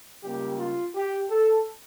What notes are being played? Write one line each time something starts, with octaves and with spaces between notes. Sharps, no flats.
C#2 C#3 G3 A#3 G4
F4
G4
A4